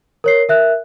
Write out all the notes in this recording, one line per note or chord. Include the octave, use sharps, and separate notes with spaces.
A#4 C#5 C7
A#4 E5 F#6